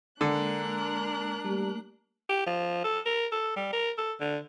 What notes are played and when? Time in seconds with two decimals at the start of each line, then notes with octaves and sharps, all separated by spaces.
0.21 D3 G#3 A#3 D4 A#4 F#6
1.45 G3 A3 A#3
2.30 G4
2.47 F3
2.84 A4
3.06 A#4
3.32 A4
3.56 G3
3.73 A#4
3.98 A4
4.21 D3